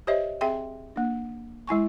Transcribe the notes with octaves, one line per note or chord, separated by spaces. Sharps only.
G4 C5 C#5 D#5 E5
C4 G#4 E5 G5 C6
A#3 D4
G#3 E4 G#5 C#6